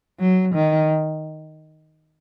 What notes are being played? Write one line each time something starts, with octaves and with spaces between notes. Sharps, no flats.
F#3
D#3